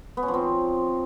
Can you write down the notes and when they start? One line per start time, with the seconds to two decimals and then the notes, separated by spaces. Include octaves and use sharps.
0.17 B3
0.23 C#4
0.28 F3
0.34 C4